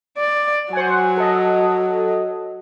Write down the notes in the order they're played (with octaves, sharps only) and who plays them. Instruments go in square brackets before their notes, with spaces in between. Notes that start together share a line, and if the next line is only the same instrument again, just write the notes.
[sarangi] D5
[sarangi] F#3 [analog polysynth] C5 F#5 G#5
[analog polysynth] A4 D#5